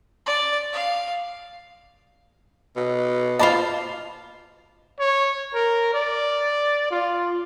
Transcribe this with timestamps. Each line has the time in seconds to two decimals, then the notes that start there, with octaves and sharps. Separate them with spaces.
0.26 D5
0.73 F5
2.76 B2
3.39 F4 C5 D5 D#5 A5 B5
4.99 C#5
5.54 A#4
5.94 D5
6.91 F4